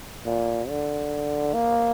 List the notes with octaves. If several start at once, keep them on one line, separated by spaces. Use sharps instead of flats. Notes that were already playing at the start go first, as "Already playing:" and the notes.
A#2
D3
A#3